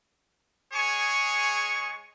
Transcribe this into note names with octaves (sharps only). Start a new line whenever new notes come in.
G#3 G#4 C#5 G#5 C#6